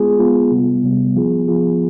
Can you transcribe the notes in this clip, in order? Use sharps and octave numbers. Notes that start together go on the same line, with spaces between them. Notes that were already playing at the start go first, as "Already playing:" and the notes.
Already playing: G#3 B3 F4 G#4
G#3 B3 F4 G#4
C3 G3 B3
C3 G3 B3
F3 B3 F4 G#4
F3 B3 F4 G#4